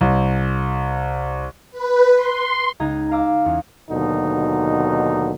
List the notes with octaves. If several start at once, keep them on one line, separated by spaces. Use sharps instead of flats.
C2
B4
C6
C#2 D#4 D#5 A#5 G#6
F5 A#5 D6 E6
E2 C#4
D#2 B2 D3 F#3 D#4